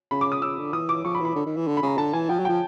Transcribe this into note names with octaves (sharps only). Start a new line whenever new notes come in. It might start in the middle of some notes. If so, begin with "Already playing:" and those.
C#3 B5
D6
D#6
C#3 E6
D3
E3 D#6
D6
F3 C#6
B5
E3
B5
D3
D#3
E3
D3
B5
C#3
A#5
D3 A5
E3 G#5
F3 G5
F#3
F3 G5